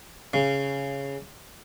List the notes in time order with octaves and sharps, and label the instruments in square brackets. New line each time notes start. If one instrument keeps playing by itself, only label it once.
[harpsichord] C#3